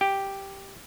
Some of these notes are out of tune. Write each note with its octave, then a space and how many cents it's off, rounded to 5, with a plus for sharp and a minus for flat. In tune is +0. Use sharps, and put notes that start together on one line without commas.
G4 +0 G5 +0